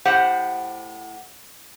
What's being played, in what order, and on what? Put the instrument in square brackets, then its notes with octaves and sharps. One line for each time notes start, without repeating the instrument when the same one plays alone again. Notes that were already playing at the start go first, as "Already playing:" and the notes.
[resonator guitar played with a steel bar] A2 G4 C5 F#5